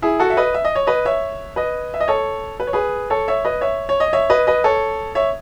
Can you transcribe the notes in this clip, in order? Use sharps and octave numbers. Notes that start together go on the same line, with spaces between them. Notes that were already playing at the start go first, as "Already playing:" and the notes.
E4 G#4
F#4 A4
E5
B4 D#5
E5
D#5
C#5
B4 D#5
C#5 E5
B4 D#5
E5
D#5
A4 C#5
B4
C#5
G#4 B4
A4 C#5
C#5 E5
B4 D#5
C#5 E5
C#5
D#5
C#5 E5
B4 D#5
B4 D#5
A4 C#5
C#5 E5